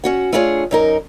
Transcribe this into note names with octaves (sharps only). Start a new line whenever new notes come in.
C#4 F#4 F#5
A3 D4 E4 F4 G#4 C#5
F#2 D#4 A#4